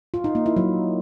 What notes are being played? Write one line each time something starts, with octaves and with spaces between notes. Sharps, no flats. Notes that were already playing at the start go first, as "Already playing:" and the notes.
F4
D#4
A#3
E4
F#3